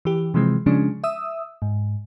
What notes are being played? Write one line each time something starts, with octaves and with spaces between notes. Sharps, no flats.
E3 G4
C3 E3 F3 G#3 C4
C#3 F3 G#3 C#4 D4
E5 D#6 E6
G#2